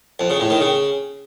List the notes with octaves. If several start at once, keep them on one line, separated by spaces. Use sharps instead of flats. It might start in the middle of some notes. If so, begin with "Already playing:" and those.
F2
C#3
A2
D#3
C#3